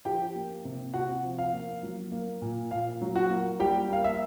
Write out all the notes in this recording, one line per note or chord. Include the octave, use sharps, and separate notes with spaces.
F3 G4 G5
A#3
C3
C3 F#4 F#5
F3
F5
A#3
F#3
A#3
A#2
A#2 F5
F#3
F#4 F#5
A#3
G3 G4 G5
A#3 F5
E5